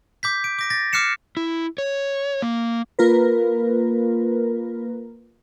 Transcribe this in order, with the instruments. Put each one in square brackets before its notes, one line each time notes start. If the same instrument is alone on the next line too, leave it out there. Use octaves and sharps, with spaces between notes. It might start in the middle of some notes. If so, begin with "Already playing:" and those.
[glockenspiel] D6 G6 B6
D7
D6 A#6 D7
A6 A#6
D6 F6 F#6 C7 C#7 E7
[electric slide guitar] E4
C#5
A#3
[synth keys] A#3 F4 A#4 B4